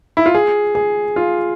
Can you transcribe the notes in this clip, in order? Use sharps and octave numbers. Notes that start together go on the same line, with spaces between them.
E4
F4
G#4
G#4
F4